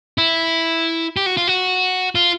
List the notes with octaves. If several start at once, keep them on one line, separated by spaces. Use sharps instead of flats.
E4
G4
F#4
F4
F#4
F4